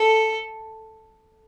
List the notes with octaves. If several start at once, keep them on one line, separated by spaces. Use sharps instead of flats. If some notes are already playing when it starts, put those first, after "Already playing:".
Already playing: A4